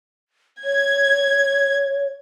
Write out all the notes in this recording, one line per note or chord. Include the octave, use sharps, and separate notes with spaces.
C#5 G#6